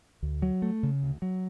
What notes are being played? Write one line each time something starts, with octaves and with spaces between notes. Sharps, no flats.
D2
F#3
A3
C#3
D2
F#3